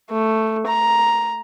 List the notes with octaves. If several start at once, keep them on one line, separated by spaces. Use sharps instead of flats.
A3
A#5